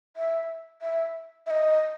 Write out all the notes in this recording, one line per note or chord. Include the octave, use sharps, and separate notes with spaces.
E5
E5
E5
D#5